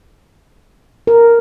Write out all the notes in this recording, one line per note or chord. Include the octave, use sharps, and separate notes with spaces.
A#4